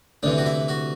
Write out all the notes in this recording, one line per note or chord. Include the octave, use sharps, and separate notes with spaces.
D2 C3 E3 D4
F#4
E4
F#4